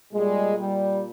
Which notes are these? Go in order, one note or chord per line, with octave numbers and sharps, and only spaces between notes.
A#2 G3 G#3
G3